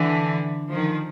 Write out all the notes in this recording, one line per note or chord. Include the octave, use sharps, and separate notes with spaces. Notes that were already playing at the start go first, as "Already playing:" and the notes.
Already playing: D3 E3
D#3 F3